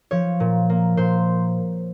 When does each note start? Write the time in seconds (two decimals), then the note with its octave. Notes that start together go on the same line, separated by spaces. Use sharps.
0.11 F3 C#5
0.40 A#2
0.69 A#3
0.97 A#2 C5